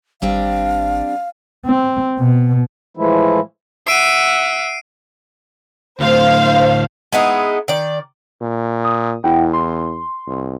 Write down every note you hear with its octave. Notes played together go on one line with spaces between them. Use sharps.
G#1 G3 C4 D4 F5
C4
B2
A2 E3 F3 G#3 A3 E4
E5 F#5 C7 D7 D#7
D2 A2 C5 F5
G#3 B3 D#4 E4
D#3 D5
A#2
D#6
E2 E4 F#5 G5
C6
C2